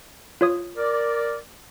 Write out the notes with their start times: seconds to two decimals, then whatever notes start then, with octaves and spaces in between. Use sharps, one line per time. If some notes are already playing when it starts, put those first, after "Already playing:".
0.41 F4 C#5 D#6
0.77 A#4 D5